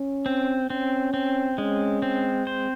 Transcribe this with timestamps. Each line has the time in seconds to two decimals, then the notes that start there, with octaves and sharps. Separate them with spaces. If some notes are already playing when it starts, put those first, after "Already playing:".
Already playing: C#4
0.26 C4
0.70 C4 C#4
1.14 C4
1.57 G#3 C#4
2.02 C4
2.47 C5